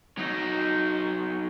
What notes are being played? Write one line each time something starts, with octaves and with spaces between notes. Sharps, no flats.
F#3 D#4